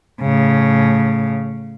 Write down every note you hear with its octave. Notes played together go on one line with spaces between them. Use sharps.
A2 C#3